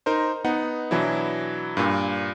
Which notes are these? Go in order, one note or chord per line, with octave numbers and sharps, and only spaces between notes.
D#4 A#4 C5
B3 D#4 F#5
B2 E3 F#3 D4 E4
G2 A#2